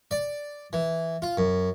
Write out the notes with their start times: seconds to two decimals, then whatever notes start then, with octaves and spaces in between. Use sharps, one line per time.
0.11 D5
0.73 E3
1.22 F4
1.37 F#2